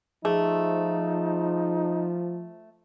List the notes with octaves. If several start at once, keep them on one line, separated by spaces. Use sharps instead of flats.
F3 A3 D#4 G#4